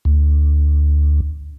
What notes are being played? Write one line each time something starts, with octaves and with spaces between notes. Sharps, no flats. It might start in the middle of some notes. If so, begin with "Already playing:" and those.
D2